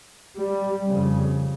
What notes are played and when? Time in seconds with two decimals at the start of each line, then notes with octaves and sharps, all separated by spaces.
0.38 G3
0.88 F2 C#3